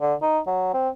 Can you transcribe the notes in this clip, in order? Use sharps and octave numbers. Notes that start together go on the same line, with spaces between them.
D3
D#4
F#3
C4